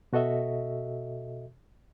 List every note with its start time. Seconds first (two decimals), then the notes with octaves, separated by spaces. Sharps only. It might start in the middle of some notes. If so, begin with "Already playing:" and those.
0.13 B2 F#4 A4 D#5 E5